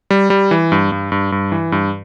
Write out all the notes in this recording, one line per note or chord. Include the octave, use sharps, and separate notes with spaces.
G3
G3
E3
G2
G2
G2
G2
E3
G2